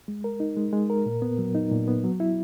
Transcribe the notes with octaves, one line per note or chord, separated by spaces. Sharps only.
G#3
A#4
D#4
G#3
G#3
A#4
A#2
B3
F#3
D#4
A#2
B3
F#3
E4